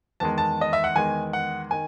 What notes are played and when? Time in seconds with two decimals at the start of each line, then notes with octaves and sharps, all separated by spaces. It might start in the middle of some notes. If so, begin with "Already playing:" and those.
0.20 E2 D#3 G#3 A5
0.38 A5
0.61 D#5
0.73 E5
0.84 F#5
0.95 E2 D#3 G#3 G#5
1.33 F#5
1.71 D#3 G#5